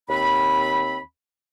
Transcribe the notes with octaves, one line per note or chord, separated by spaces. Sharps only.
D#2 C4 B5